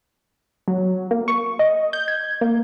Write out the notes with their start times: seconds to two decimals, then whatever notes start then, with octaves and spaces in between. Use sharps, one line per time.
0.68 F#3
1.11 A#3
1.28 C#6
1.59 D#5
1.93 G6
2.08 G#6
2.41 A#3